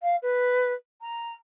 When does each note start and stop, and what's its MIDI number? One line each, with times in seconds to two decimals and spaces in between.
0.01 0.15 77
0.22 0.72 71
1.01 1.33 82